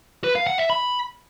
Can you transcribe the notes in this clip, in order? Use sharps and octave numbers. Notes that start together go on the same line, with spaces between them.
B4
F5
F#5
E5
B5